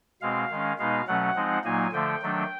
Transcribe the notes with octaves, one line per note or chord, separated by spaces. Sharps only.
B2 G#3 C4 F5
D#3 G#3 C#4
B2 G#3 B3 D#4 F5
B2 F#3 A3 C#4 F#5
F3 G#3 C4 D#4
A#2 F#3 A#3 D#4 G#5
D3 F3 A3 G5
D#3 F#3 A3 D4